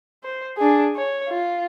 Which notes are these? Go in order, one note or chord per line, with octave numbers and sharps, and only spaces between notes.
C5
D4 G#4
C#5
F4